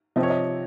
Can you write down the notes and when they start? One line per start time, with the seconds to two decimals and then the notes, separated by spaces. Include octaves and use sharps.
0.16 C3 F3 C4 D#5
0.23 C#5
0.30 D#5